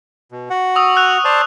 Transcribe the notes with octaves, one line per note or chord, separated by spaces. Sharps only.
B2
F#4 F#5
C#6 D#6 E6
E6 F#6 F7
C5 D5 A5